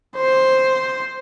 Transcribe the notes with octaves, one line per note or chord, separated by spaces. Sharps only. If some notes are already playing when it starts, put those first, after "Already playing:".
C5